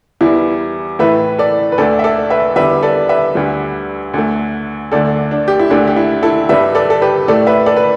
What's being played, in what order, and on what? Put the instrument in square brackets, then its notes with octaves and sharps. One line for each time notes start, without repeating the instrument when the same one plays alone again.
[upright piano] E2 E3 G3 E4
A2 E3 A3 B4 E5
A4 D5
B4
D2 D3 A3 A4 D5
E5
A4 D5
B4 E5
E2 D3 G3 B4 E5
A4 D5
B4 E5
D2 D3 G3
D2 D3 A3
D2 D3 A3 A4 D5
D4
G4
E4
D2 D3 A3 D4
G4
E4
E4 A4
G2 G3 B4 E5
A4 D5
A4
G4 B4
A2 A3 A4 D5
B4 E5
A4 D5
B4